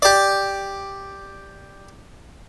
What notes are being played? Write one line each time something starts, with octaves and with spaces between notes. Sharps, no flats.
G4 D5